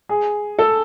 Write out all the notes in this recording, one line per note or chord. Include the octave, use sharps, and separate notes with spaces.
G#4
A4